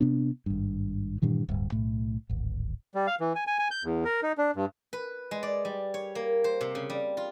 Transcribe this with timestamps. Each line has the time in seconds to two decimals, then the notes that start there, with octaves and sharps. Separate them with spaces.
0.01 C3 B3 D4
0.46 G#1 G2
1.22 G2 A#2 D#3 E3
1.49 D1 G2
1.72 B1 A2
2.30 D1 G#1
2.95 G3
3.07 F5
3.20 E3
3.35 G#5
3.47 G#5
3.59 G#5
3.71 G6
3.84 E2
4.05 A#4
4.23 D#4
4.38 D4
4.56 G2
4.93 B4
5.31 G#3
5.43 D5
5.65 G3
5.94 C#5
6.15 A#3
6.44 C5
6.61 C3
6.75 C#3
6.90 G3
7.17 F4